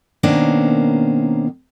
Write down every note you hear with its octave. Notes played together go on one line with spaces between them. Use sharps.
B2 D#3 A#3 C#4 D4 C5